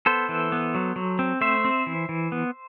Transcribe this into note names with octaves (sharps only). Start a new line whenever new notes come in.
B3 A4 C5
E3
B3
F#3
F#3
C4
A3 C5 E5
C4
E3
E3
B3